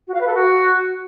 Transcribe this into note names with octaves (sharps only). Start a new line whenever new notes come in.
F#4
F5
B4
A4
F#4